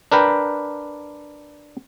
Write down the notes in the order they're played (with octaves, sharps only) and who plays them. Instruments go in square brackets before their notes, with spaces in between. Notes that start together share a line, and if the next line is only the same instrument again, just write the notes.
[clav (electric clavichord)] D4 A#4 B4 G5